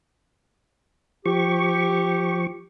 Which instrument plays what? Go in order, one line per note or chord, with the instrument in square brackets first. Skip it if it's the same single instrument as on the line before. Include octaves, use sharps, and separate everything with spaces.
[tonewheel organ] F3 C#6 [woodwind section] G4